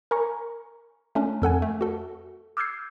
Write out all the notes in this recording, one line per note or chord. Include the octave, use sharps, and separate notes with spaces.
A#4 G#5 A#5 C#6
A3 C#4 D4
F2 A4 F#5 G#5
A3
F#4 A4
D6 E6 F6 G6 G#6 C7